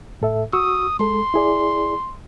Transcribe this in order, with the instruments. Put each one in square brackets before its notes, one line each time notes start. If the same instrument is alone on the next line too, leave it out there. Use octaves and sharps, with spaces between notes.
[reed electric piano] A2 A4 E5
[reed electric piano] F#4 C#6 E6 [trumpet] D#6
[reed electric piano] G#3 A4 [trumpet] C6
[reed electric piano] E4 G#4 D5